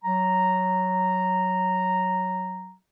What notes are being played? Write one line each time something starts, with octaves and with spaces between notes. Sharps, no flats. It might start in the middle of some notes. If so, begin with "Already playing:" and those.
F#3 A#5